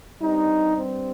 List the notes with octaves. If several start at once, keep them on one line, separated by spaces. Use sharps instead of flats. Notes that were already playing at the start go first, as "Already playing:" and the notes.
G2 G3 C4 D#4
C4